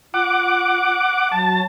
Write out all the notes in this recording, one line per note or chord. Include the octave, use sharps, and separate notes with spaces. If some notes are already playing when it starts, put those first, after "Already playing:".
F4 F#5 D6
F#3 A5